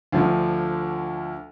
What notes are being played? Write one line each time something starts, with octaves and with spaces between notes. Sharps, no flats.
D2 D3 F3